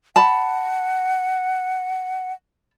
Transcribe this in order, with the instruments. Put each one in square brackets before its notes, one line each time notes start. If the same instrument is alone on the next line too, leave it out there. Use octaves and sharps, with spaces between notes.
[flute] F#5 [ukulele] A5 B5